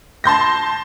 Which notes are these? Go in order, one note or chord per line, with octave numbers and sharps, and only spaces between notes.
A5 C6 G6 A#6